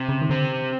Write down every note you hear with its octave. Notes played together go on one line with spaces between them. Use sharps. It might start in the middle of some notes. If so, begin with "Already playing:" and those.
Already playing: C3
C#3
D#3
D3 C4